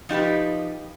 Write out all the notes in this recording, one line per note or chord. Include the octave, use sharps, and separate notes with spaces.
F3 D#4 G4 B4